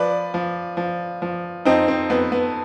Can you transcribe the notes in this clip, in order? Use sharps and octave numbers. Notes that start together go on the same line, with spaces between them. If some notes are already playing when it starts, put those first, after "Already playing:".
Already playing: F3 B4 D5
F3
F3
F3
F2 C4 D#4
C4
F2 B3
B3